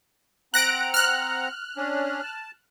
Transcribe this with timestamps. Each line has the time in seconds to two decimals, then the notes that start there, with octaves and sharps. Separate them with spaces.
0.54 C4 F#5 A#5 F#6 A#6 D7
0.94 F6 F#6
1.77 C#4 D4
2.23 A5